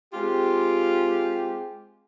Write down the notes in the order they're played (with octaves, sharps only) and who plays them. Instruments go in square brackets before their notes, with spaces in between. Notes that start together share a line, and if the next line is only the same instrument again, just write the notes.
[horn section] G#3 C4 G4 [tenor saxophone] F4